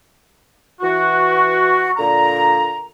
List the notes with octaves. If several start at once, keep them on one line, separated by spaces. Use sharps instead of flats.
E3 F#4
A#2 D3 A#5